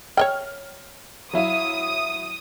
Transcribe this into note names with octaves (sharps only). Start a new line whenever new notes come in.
C#5 D#5 G5 F6
F#3 E4 F5 D#6